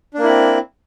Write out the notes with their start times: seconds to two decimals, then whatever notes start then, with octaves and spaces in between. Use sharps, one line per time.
0.14 D4
0.19 A#3
0.23 E4
0.28 C4